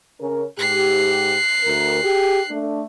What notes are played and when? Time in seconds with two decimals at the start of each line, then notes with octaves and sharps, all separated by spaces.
0.19 C#3 C#4 A#4
0.59 G#2 G4 F#6 C7
1.64 D2 A#4
2.03 G4 G#4
2.49 A3 D4